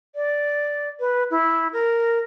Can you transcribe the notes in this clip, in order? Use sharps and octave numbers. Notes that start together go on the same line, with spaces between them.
D5
B4
E4
A#4